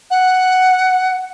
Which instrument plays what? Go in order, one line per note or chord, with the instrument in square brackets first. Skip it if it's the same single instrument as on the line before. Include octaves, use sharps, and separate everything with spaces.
[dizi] F#5